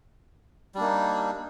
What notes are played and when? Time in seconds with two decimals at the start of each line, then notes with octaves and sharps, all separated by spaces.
0.75 G3
0.78 D4
0.80 A#3
0.83 D#4